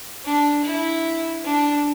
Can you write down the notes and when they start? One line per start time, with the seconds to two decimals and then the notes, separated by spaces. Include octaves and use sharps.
0.25 D4
0.64 E4
1.44 D4